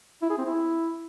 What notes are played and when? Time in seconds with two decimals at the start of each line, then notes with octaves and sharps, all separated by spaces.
0.22 E4
0.30 G#4
0.38 C4
0.46 E4